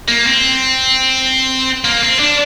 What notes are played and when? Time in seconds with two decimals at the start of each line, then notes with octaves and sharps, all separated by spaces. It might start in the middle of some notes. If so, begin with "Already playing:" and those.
0.08 A#3
0.26 C4
1.84 A#3
2.03 C4
2.19 D4